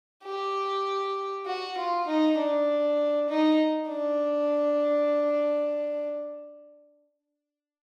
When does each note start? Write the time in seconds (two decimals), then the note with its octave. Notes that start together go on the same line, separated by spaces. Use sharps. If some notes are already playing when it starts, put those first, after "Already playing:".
0.24 G4
1.46 F#4
1.77 F4
2.07 D#4
2.37 D4
3.29 D#4
3.89 D4